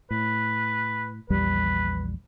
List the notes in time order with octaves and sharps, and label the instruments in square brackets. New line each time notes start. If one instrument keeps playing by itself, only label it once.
[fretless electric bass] A2 [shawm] B4
[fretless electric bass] A#1 E2 G3 [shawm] B4